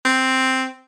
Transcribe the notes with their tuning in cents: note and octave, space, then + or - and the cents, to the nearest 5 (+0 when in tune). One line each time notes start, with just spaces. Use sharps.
C4 +0